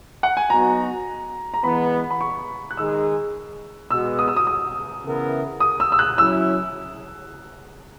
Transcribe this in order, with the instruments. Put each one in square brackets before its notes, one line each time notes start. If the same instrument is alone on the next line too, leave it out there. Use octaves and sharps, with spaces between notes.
[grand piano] F#5
G#5
[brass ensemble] F#3 B3 D#4 F#4 [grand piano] A#5
[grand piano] A#5
[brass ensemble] E3 G#3 B3 [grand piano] B5
[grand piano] B5
C#6
F#6
[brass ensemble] D#3 G#3 D#4 G#4 [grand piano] E6
[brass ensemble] B2 G#3 B3 F#4 [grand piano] E6
[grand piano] D#6
E6
D#6
D#6
[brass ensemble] C#3 E3 B3 E4 A#4
[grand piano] D#6
E6
E6
F#6
[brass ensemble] F#3 C#4 E4 [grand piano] E6